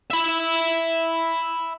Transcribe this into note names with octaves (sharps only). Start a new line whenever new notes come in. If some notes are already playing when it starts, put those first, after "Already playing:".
E5 B5